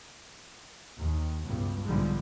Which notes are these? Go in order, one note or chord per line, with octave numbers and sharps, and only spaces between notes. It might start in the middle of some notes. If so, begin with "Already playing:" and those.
D#2
C#2 G2 B2
B1 G#2 D3 F3 G3 G#3